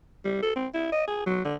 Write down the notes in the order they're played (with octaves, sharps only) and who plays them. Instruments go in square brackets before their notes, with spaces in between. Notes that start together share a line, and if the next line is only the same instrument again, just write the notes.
[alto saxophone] G3
A4
C4
E4
D#5
G#4
F#3
D3